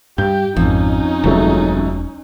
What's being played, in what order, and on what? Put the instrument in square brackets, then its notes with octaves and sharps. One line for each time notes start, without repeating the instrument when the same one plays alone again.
[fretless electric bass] G2 [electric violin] G4 [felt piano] G6
[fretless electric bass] G#1 [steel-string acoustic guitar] F2 [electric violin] C#4 D#4
[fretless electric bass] E1 [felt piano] C#2 F#3 A3